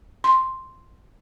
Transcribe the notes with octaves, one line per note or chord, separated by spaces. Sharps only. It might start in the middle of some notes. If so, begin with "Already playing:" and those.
C6